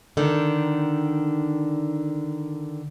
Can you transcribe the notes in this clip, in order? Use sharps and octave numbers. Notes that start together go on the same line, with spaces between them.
D3 D#3